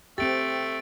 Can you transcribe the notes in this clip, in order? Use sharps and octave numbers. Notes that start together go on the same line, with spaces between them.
A3 C4 G4 A6 D7